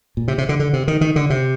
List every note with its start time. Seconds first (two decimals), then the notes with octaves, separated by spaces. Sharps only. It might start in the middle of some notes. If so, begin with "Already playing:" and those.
0.17 A#2
0.28 C3
0.38 C3
0.49 D3
0.59 D3
0.73 C3
0.88 D#3
1.01 D#3
1.16 D3
1.30 C3